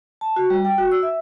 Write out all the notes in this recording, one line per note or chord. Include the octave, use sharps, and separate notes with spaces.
A5
F#4
G3
G5
F#4
E6
E5